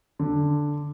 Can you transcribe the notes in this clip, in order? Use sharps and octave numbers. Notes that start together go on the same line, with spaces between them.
D3